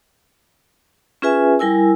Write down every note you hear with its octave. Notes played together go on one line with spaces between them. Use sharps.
C#4 F4 G#4 B4 E5 G#5
G3 E4 A#4 G#5 E6